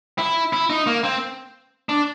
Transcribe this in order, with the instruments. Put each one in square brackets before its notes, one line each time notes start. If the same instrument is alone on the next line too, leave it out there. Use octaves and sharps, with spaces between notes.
[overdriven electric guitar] E4
E4
D#4
A#3
C4
D4